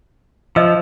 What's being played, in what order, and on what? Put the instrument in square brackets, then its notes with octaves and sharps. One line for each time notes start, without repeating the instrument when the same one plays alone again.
[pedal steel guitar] F3 [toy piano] D#5 E6